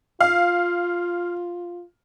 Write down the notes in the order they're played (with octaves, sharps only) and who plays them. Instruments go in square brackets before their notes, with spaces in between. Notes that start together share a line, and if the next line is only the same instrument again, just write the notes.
[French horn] F4 [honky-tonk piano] F5